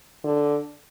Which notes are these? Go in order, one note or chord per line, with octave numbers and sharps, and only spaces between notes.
D3